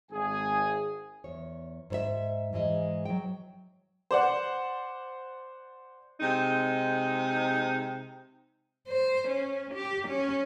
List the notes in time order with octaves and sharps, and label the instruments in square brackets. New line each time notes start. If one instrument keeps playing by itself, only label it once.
[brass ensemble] G#1 G#4 G#5
[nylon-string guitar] E2 C#5
G#2 C5 E5
G#2 E3 G#3 D#5
F#3 G5
[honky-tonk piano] C5 D5 F#5
[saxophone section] C3 G#3 D#4
[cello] C5
C#4
G4
C#4